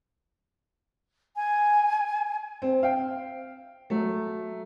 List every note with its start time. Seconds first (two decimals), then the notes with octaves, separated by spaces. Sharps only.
1.36 G#5
2.62 C4
2.83 F5 G5
3.90 F#3 A3